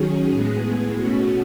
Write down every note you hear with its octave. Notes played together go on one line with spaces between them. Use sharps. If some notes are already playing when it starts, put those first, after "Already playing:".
Already playing: D#3 F#3 C#4 G#4
A2 G#3 B3
B2 A3 C#4 F#4